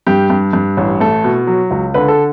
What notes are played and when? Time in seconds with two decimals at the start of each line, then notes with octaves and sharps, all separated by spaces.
0.07 G2 G4
0.30 G2
0.53 G2
0.77 A1
1.00 A3 A4
1.24 B2
1.47 F#3
1.71 C#2
1.94 D3 B4
2.08 A4